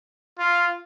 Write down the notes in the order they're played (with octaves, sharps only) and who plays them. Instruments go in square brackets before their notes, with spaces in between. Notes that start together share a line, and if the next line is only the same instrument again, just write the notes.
[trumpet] F4